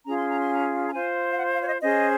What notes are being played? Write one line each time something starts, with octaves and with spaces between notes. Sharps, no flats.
C#4 F4 G#4 A#5
C6
A#5
C6
A#5
A#5
F4 C5 G#5
F5
F#5
F5
C#5
D#5
C#4 G#4 C5 D#5